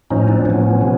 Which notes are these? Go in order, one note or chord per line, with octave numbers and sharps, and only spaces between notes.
A2 F3 C#4 D#4
C4 D4
A2 F3 B3 C#4
C3 F3